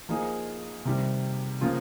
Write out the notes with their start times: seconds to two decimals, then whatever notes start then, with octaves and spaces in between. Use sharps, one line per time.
0.09 F3 A#3 D#4 G#4
0.85 C3 D#3 G3 C4
1.61 C#3 F3 A#3 F4